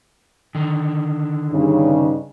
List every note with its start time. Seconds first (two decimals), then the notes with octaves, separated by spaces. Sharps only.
0.55 D3 D#3
1.51 G2 C#3 D#4